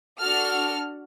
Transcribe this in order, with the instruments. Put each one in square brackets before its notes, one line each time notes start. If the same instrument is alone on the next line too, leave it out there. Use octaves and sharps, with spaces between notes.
[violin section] D4 F#4 A4 F6